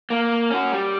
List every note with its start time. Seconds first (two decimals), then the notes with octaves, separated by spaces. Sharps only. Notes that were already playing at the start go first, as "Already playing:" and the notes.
0.10 A#3
0.50 C#4 F#4
0.72 G3